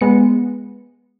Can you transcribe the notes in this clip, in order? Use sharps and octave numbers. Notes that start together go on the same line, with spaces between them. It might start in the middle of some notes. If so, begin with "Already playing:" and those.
G#3 B3 C#7